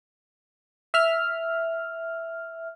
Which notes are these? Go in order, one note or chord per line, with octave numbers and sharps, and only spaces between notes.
E5 F6